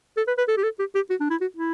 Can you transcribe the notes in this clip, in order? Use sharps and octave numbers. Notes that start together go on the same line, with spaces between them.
A4
B4
B4
A4
G4
A4
G4
G4
F#4
D4
E4
F#4
E4